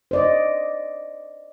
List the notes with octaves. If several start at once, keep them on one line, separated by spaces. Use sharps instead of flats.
C5 D5 D#5